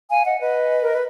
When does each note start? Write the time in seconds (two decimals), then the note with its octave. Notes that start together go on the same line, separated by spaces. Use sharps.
0.09 F5 G#5
0.24 D#5 F#5
0.40 B4 D#5
0.83 A#4
0.93 B4